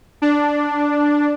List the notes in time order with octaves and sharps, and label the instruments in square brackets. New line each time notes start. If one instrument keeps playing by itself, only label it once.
[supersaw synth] D4